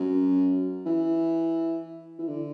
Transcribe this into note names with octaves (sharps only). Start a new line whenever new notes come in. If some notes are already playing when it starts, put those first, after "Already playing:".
Already playing: F#2
E3
E3
D3